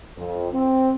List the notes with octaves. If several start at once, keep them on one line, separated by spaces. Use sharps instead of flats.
F2
C4